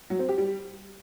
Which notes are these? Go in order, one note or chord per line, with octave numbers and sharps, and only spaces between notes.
F#3
C4
G4
G3